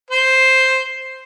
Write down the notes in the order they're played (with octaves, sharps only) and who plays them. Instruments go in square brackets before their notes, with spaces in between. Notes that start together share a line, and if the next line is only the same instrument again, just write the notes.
[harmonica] C5